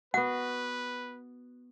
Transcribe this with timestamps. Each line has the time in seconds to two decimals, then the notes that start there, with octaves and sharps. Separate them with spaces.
0.14 B3 F#4 B4 F#5